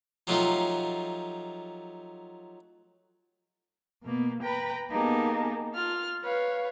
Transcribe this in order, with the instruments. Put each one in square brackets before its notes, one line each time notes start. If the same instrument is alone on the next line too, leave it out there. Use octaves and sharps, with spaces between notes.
[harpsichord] F3 F#3 A3 D#4 F4 G4
[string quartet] B2 A#3 B3
B4 G5 A#5 B5
A#3 B3 D#4 G4 G#4 A5
F4 F6
B4 C#5 F5